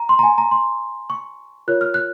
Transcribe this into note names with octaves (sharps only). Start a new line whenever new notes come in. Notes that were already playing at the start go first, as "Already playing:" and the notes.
Already playing: A#5
C6
A#5
G#5
A#5
C6
C#6
F4 A#4 C#5 F#6
F6
F#6